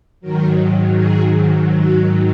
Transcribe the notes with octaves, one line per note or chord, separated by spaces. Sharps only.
G#2 D#3 F#3 A#4
G#4
F#4